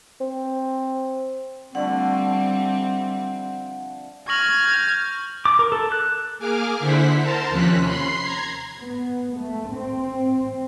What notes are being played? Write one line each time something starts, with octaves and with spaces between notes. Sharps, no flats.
C4
D3 F3 G3 A3 C4 F#5
C#6 F6 G#6 A#6 F#7
G6
D6
A#4
A4
F#6
A#3 G#4 G#5 D6 F6
D3 E4 C5 F#5 B6
A#4 C5 A5 A#5 C6
D#2 C3 F3 C#4 F#6 B6
B5 C6 C7
A#5 G#6
B3
A3
C4